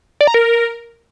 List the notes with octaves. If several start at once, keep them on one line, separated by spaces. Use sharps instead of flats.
D5
A#5
A#4